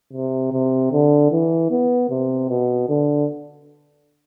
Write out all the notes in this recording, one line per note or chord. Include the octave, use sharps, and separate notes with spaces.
C3
C3
D3
E3
B3
C3
B2
D3